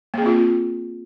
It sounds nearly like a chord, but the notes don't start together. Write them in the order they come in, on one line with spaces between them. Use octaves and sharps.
A#3 G#4 C4 F4